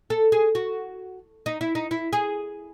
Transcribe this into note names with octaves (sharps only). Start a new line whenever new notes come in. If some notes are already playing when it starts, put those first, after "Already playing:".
A4
G#4
F#4
D#4
E4
D#4
E4
G#4